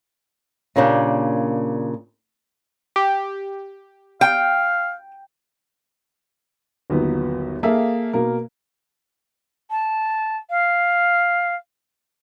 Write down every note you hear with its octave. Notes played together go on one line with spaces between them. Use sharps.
A#2 C#3 A#3 D4 G4
G4
F5 G5
G1 D#2 F#3 B3
A#3 G#4 A4 E5 F5
B2 A#3 A#4
A5
F5